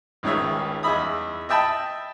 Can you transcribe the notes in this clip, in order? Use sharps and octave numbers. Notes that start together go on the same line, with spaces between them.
G#1 C#2 D#3 C#4 G#4 E5
E2 D#5 E5 B5 D#6
D#5 E5 G5 A5 B5